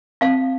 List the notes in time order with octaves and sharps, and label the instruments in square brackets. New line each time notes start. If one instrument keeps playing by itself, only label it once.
[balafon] C4 [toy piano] F5